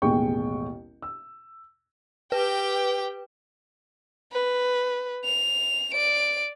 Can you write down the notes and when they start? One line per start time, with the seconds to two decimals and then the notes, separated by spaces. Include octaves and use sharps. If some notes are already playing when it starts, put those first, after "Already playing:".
0.02 A1 D#2 B2 G#3 G5 C#6
1.02 E6
2.32 G4 B4 G5
4.32 B4
5.25 F7
5.94 D5 D7